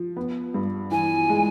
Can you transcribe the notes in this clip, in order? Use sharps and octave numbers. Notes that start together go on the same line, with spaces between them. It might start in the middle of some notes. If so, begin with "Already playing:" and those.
Already playing: F3
B3
G2
E3 G#5
G#3